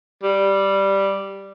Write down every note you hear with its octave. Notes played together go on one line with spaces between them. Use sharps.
G3